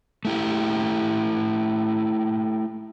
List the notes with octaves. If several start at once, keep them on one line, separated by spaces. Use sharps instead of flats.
A3 E4 G4